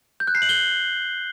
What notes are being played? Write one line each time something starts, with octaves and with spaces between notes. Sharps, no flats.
G6
F#6
C7
F#7
G7